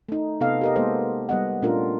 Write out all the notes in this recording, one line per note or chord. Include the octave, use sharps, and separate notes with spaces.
A3 D#4
C3 B3 A4 D#5 F5
G4 A#4 D#5
G#3 A#3 B3 A4 C5 D#5
G3 B3 D#5 F#5
A#2 A3 C#4 D4 F4 A#4